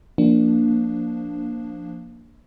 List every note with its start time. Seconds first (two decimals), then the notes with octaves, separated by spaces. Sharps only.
0.18 F3 A#3 D4